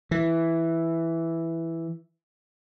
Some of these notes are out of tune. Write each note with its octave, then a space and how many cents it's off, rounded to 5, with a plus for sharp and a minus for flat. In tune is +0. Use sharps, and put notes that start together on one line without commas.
E3 +0